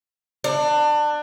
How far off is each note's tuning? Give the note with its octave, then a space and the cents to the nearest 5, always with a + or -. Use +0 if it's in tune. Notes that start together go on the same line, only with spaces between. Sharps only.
D4 +25